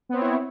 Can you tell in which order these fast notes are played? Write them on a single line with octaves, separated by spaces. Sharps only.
B3 C4 C#5 E4